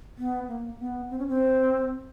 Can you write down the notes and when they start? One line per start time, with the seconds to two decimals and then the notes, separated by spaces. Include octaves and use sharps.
0.18 B3
0.48 A#3
0.80 B3
1.10 C4
1.19 C#4
1.28 C4